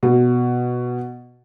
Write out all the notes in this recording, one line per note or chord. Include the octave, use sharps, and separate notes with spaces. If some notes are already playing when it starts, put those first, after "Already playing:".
B2